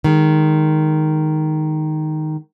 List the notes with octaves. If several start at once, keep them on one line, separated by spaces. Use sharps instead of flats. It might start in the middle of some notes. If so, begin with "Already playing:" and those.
D#3 G#3